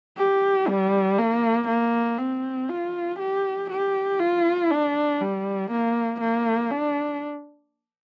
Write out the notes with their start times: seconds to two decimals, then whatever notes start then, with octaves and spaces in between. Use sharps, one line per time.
0.18 G4
0.67 G3
1.18 A#3
1.68 A#3
2.18 C4
2.69 F4
3.19 G4
3.70 G4
4.19 F4
4.70 D4
5.21 G3
5.71 A#3
6.20 A#3
6.71 D4